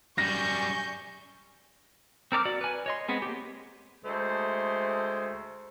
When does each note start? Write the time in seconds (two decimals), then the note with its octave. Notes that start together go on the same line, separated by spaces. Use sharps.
0.18 F#2 G3 G#5 C#6 G6 A#6
2.32 C4 A#4 D5 D6 F6
2.45 F#4 D5
2.61 B4 G#5
2.86 C#5 D#5 C6
3.08 G#3 B3 C4 G#4
3.22 A#3 G4
4.04 D2 G#3 A3 C5